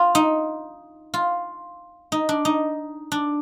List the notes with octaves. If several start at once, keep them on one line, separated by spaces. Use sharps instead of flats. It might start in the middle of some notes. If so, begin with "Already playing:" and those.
Already playing: F4
D#4
F4
D#4
D4
D#4
D4